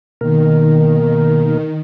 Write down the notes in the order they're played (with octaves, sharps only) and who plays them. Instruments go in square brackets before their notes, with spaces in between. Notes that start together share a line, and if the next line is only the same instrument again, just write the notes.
[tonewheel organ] B2 A#3 A#4 [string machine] D#3